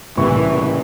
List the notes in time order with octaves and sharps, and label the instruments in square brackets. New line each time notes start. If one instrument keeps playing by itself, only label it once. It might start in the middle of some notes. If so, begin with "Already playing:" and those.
[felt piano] C2 C#6 [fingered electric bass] A2 C#3 A#3 [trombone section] E3